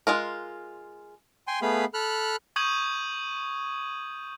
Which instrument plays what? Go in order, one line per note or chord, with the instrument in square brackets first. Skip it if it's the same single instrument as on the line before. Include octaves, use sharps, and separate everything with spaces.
[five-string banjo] G#3 F4 A#4
[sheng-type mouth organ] G5 G#5 C6
A3 B3 G#4 F5 B5
A4 B5 F6 F#6
[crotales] C#6 D#6 G6 G#6 D#7 F#7